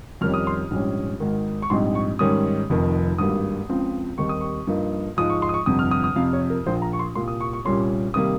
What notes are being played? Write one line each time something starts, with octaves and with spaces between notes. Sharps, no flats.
F2 D#3 G3 C#4 F6
D#6
C6
A#1 G#2 G3 C#4
G#1 G#2 D#3
C#6
A#1 G#2 G3 C4 D#4 C6
C#6
G#2 D#3 G3 C#4 D#6
F1 F2 D#3
G#1 G2 G3 A#3 D#6
C#2 C#3 F3 C4
D#2 D#3 G3 C4 D#4 C#6
D#6
C#6
G2 F3 A#3 D#4
G#2 F3 G#3 D#4 D#6
C#6
C6
D#6
C#6
G1 F2 C3 D#6
F6
D#6
D#6
F2 C3 F3 F5
C#5
A#4
A#1 A#2 F3 C5
A#5
C#6
C6
C2 A#2 G3 A#3 C6
D#6
C#6
C#6
C2 A#2 G3 A#3 C#4 C6
C3 D#3 G3 A#3 D#6